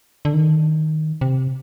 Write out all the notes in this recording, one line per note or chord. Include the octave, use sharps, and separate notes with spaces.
D3
D#3
C3